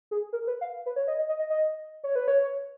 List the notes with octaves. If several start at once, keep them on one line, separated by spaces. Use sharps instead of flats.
G#4
A#4
B4
F5
B4
C#5
D#5
D#5
D#5
D#5
D#5
C#5
B4
C#5